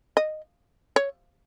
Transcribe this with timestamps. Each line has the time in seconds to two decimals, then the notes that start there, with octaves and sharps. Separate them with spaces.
0.17 D#5
0.96 C#5